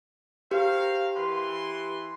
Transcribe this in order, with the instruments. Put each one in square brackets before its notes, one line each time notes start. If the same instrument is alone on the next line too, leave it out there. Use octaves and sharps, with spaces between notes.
[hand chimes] G4 [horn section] A#4 C5 F5
[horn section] E3 B4 C6